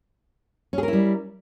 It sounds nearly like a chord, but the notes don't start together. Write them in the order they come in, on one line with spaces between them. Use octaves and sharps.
C#4 G#4 A#4 E4 G3